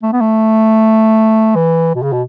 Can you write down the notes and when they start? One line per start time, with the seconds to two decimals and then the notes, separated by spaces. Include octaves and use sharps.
0.03 A3
0.13 B3
0.21 A3
1.55 E3
1.95 B2
2.03 C#3
2.13 B2